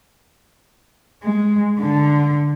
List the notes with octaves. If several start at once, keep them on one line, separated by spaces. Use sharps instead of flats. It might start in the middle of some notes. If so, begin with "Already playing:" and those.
G#3
D3